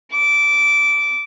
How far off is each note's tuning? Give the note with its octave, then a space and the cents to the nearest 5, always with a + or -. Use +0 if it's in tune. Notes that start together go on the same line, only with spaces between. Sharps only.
D6 -15